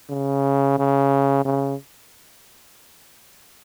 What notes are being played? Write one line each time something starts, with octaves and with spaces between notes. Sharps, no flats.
C#3
C#3
C#3